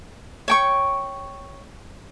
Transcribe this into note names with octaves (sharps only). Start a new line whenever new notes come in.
C#5 G5 C#6